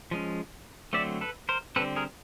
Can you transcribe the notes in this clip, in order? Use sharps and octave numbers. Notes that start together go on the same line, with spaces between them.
F3 G#3 C#4
D3 F#3 A3 C4 D5 E5
A4 B4
A#4 C5
D3 G3 C4 A4 B4
G#4 A#4